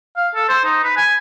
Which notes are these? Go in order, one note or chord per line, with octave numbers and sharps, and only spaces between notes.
F5
A4
C5
D#4
B4
G#5